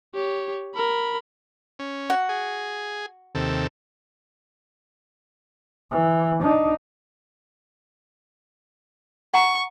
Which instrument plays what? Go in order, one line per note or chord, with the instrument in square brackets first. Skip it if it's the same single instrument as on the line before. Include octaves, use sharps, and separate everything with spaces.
[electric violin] G4 C#5
A#4 B5
[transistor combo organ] C#4
[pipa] F#4
[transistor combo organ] G#4
D#2 C3 A4
[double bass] E3
D4 D#4
[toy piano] F#5 A#5 [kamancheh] C#6